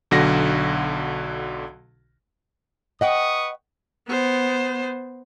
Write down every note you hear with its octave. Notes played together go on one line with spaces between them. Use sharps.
B1 D3 F#4 A#6
B4 D#5 F#5 G5 C#6 D#6
B3 C5